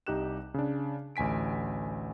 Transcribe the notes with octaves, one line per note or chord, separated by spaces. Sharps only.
C2 D#4 G4 F#6 E7
C#3 D4
A1 D2 G#5 B6 D7